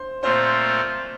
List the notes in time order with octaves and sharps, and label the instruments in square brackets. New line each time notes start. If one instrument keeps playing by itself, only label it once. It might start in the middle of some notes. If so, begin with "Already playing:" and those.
Already playing: [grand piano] C5 C6
[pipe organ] A#2 A3 C4 F4 [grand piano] C5 C6